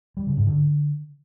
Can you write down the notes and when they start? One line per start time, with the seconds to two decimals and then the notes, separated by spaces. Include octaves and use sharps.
0.17 G3
0.27 C#3
0.37 G#2
0.47 D3